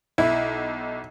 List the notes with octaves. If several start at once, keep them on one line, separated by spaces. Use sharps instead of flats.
B1 E4